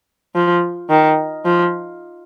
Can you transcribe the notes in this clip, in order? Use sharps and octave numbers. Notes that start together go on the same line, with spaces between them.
F3
D#3
F3